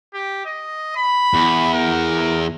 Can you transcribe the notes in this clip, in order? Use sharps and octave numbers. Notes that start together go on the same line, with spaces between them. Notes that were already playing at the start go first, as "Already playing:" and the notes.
G4
D#5
B5
E2
A#4